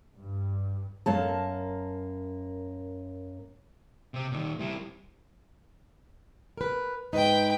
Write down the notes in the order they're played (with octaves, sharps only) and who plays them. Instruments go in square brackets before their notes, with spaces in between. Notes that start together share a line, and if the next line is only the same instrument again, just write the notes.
[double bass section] G2
[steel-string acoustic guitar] F#2 A#3 A5
[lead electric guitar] C3 C4
A#2 D#3
G3 E4
[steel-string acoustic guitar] A#4 B4
[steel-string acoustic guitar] G#2 D#4 [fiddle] B4 G5